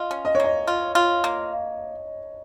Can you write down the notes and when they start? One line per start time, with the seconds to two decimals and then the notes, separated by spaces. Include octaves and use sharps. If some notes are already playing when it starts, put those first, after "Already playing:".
Already playing: F4 D#5
0.11 C#4
0.25 D#5
0.35 C#5
0.40 A#3 D#5
0.67 F4
0.95 F4
1.24 A#3